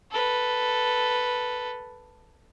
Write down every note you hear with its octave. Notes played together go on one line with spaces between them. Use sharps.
A4 B4